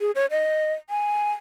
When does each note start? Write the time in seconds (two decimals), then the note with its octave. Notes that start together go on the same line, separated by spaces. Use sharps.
0.01 G#4
0.15 C#5
0.31 D#5
0.90 G#5